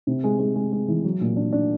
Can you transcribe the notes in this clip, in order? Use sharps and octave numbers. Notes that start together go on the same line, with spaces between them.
C3
G#3
G#3
G#3
G#3
E3
F#3
A#2
D4
D4